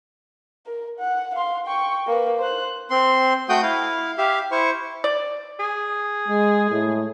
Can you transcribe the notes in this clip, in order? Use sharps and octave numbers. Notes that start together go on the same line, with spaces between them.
A#4
F#5
F5 C6
G5 C#6
A#3 B4
C5 F#6
C4 C6
A3 F#4 F#5 G5 D#6 G6
E4 F5
G4 E5 F5
E4 C5 C#6
D5
G#4
G#3
A2